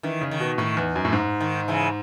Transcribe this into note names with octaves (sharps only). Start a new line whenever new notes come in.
D#3 E3
C#3
D#3
B2
A2 D#3
E2
F#2
A2
G#2
D#3
C#3 E3